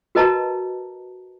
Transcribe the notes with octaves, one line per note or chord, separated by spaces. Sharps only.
F#4 A#4 B4 D#5 A5 A#5